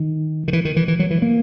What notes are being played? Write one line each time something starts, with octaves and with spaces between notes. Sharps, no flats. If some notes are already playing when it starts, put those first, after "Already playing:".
Already playing: D#3
D#3
E3
D#3
E3
E3
F#3
E3
A#3